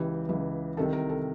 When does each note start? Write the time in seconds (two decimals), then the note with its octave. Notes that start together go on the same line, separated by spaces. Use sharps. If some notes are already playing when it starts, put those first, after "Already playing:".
Already playing: C#2 C#3 E3 G4
0.29 C#2 C#3 E3
0.77 C2 C3 D#3 A4
0.93 A#4
1.09 A4